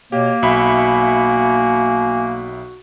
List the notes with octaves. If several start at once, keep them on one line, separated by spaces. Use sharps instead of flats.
B2 A#3 G4 C#5
B1 F#4 E5 G#5 B5